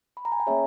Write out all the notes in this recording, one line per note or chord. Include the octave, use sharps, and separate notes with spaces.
B5
A#5
G#5
G5
A#3 C#4 G#4 C#5 E5